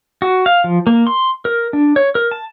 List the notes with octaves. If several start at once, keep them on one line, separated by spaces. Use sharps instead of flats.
F#4
F5
F3
A#3
C6
A#4
D4
C#5
A#4
A5